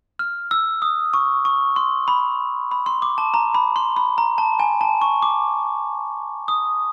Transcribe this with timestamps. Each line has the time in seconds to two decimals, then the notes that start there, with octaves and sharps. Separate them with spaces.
0.19 F6
0.51 E6
0.82 D#6
1.14 C#6
1.45 C#6
1.76 C6
2.08 B5
2.71 B5
2.86 C6
3.02 D6
3.18 A5
3.34 A#5
3.55 B5
3.76 C6
3.96 B5
4.18 A#5
4.38 A5
4.59 G#5
4.81 A5
5.02 C#6
5.22 D6
6.48 D#6